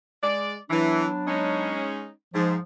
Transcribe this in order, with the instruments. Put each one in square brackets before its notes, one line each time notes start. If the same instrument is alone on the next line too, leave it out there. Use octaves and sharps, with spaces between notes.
[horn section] G#3 D5
[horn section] E3 [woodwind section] F#3 B3 D4
[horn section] G#3 C#4 D#4
[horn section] G#2 [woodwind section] F3